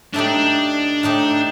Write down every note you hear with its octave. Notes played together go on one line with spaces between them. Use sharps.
A2 A3 D4 D#4 G4
A2 A3 D#4 G4